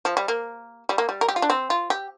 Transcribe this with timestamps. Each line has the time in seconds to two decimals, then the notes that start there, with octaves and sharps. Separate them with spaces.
0.05 F3
0.17 G3
0.28 A#3
0.89 G3
0.98 A#3
1.09 G3
1.21 A#4
1.28 G4
1.36 F4
1.42 D4
1.50 C4
1.70 F4
1.90 G4